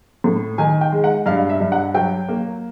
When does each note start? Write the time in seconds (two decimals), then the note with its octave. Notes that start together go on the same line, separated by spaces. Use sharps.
0.24 A2
0.58 D#3 G#5
0.81 G5
0.92 G#3
1.04 F#5
1.26 G2 F5
1.49 E5
1.60 G2
1.72 F#5
1.94 F#3 G5
2.29 A#3